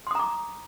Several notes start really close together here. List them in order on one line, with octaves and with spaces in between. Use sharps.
C6 D#6 A#5 D6